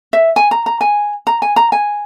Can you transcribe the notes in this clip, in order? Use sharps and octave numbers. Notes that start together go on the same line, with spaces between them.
E5
G#5
A#5
A#5
G#5
A#5
G#5
A#5
G#5